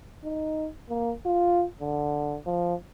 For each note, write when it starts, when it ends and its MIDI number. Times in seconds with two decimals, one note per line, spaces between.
0.24 0.69 63
0.89 1.12 58
1.26 1.65 65
1.80 2.37 50
2.46 2.75 53